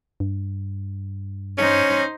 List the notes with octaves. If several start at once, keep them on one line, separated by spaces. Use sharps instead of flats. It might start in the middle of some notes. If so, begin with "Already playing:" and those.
G2
C#4 D#4 C5